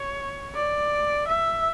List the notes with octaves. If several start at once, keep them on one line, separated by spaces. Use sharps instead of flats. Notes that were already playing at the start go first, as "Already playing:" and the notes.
Already playing: C#5
D5
E5